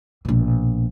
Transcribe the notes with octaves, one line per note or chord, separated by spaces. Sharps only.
A#1 B2